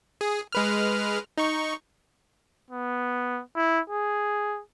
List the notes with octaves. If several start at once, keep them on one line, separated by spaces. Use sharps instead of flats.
G#4
G#3 B4 F6
D#4 C#6
B3
E4
G#4